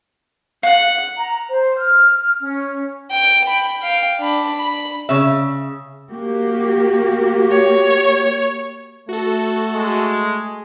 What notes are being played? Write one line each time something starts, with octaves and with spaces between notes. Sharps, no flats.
F5 F#5
A#5
C5
F6
C#4
G5
G5 B5
F5 G5
D4 B5
B5
C#3 E5
A#3 F#4 G4
C#5
A3 F#4 A4
G#3